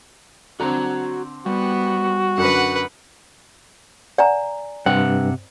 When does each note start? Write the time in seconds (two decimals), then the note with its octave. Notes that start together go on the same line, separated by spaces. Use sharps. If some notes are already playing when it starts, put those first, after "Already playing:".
0.60 D3 C4 F#4 A#5
1.46 G3 B3 F#4
2.38 F#2 D3 B4 F#5
4.18 D5 F#5 G#5 A#5
4.86 G2 C3 C4 F#5